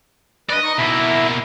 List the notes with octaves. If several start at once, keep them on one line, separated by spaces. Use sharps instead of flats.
G2 B4 D5 D#5
D#4 C#6 D#6
B2 A#3 E4 E5